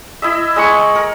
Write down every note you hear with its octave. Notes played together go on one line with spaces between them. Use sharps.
E4 D#5 E5
G#3 D#5 B5 C#6
A#4